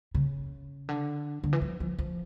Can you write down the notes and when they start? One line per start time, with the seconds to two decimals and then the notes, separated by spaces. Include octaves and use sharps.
0.15 C#3
0.89 D3
1.44 D3
1.53 E3
1.62 F3
1.80 F3
1.99 F3